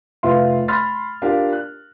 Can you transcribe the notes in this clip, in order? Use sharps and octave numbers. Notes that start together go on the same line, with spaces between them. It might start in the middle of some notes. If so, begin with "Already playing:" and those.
F1 F4 B4 E5 F5 C6
B5 C6 F6 A6
D4 F4 G4 A#4 F5
F#6